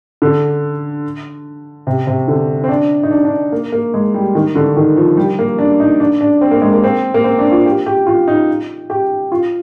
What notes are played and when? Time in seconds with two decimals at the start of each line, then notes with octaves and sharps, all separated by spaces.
0.22 D3
1.87 C3
2.07 C3
2.28 D3
2.64 C4
2.69 D4
3.03 D#4
3.11 D4
3.25 D4
3.52 A#3
3.72 A#3
3.94 G#3
4.14 G3
4.35 D#3
4.55 D3
4.77 D#3
4.97 F3
5.17 G3
5.39 A#3
5.59 D4
5.80 D#4
6.00 D4
6.21 D4
6.41 C4
6.51 A#3
6.62 G#3
6.73 A#3
6.84 C4
7.14 A#3
7.24 C4
7.39 D4
7.51 F4
7.66 G4
7.86 G4
8.07 F4
8.28 D#4
8.90 G4
9.32 F4